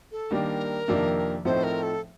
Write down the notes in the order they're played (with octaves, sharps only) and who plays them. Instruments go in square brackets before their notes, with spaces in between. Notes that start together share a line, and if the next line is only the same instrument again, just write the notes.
[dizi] A4
[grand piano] D#3 G3 A#3 D4 [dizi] A#4
[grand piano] F2 C3 D#3 A#3 D4
[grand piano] A2 F3 A3 C4 D#4 [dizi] C5
[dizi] A#4
A4